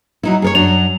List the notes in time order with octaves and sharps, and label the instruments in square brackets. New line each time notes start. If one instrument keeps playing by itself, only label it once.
[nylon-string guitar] F#3 D#4 E4
G#4 A#4 C#5
[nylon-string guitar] F#2 F#3 D4 [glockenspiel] F7